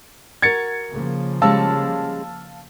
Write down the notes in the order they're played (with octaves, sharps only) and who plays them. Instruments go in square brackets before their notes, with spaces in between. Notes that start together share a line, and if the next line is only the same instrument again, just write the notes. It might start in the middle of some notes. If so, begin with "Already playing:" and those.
[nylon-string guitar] F#4 A#4 [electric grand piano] G#6 A6 C#7
[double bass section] C#3 F3 A#3
[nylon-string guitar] G3 G#3 C#4 [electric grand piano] F5 A5 E6